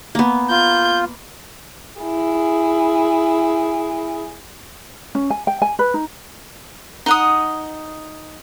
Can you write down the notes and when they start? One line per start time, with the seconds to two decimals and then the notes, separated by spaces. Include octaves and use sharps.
0.15 A#3 B3
0.50 F4 G6
2.01 E4 G#4
5.15 C#4
5.30 G#5
5.47 G5
5.62 G#5
5.79 B4
5.94 D#4
7.06 D#4 F#5 D#6